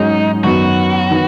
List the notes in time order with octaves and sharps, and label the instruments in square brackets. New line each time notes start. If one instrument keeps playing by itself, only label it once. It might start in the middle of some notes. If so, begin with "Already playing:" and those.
Already playing: [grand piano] G#2 F#3 C#4 G#4 [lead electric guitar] D#4
[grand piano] F#2 D#3 F#3 B3 [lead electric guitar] F#4
[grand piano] D#3 B3